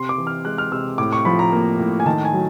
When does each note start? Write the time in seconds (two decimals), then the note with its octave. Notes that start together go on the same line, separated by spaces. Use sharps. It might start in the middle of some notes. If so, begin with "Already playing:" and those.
Already playing: C3 C6
0.09 D6
0.18 E3
0.27 F6
0.45 G#3 F#6
0.58 F6
0.72 C3 E6
0.98 A2 D6
1.13 C#6
1.25 F3 B5
1.39 A#5
1.52 A#3
1.79 A2
2.00 G#5
2.06 D#3 A5
2.25 G#5
2.33 F#3